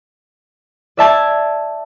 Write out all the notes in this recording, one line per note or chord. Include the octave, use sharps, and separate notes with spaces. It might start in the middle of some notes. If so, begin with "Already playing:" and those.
D5 E5 A5 G#6